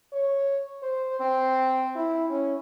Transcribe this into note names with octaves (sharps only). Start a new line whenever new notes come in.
C#5
C5
C4
E4
C#4